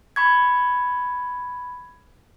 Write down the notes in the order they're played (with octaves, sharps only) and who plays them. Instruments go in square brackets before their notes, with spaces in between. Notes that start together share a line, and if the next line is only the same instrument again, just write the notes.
[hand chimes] B5 C#6 G#6